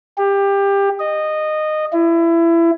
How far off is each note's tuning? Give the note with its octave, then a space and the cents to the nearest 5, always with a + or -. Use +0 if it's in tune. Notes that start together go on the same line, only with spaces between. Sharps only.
G4 +20
D#5 -15
E4 +25